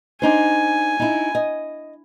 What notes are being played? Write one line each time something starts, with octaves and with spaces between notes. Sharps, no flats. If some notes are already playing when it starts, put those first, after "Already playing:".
D4 D#4 C5 G#5
D#4 E4
D#5